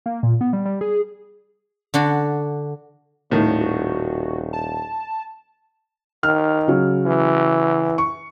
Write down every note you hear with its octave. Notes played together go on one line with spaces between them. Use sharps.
A#3
A#2
B3
G3
G3
G#4
D3 D4 F#4
D#1 A2 D#3
F#4
A5
D#3 F6
C#3 F#3
E3
C#6